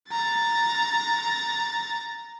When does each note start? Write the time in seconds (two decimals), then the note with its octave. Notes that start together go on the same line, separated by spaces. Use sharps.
0.10 A#5 A6